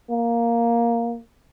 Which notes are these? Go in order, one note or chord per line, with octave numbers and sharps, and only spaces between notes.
A#3